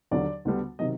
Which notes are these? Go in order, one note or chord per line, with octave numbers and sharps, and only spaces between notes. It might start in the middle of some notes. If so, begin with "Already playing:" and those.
D#2 D3 F#3 D5
D2 D3 G3 B3
C3 D#3 F#3 D#5